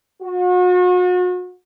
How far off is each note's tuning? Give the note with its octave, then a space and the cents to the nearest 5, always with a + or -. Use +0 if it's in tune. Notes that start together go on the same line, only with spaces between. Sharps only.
F#4 -40